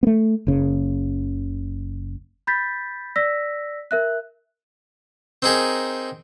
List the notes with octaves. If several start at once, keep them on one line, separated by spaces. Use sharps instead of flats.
A3 B3
F#1 C#3
B5 G6 A6 B6
D5 E6 A#6 B6
A#4 E5 F#6
C4 D#4 G#4 A#4